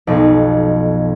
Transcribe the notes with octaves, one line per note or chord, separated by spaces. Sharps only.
B1 F2